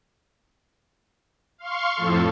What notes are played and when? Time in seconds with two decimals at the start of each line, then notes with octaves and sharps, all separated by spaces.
1.58 F5 C6 C#6
1.96 F2 A2 F3 A4